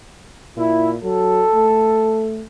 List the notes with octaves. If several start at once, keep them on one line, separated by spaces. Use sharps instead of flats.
A#2 E4
F#3 A4
A3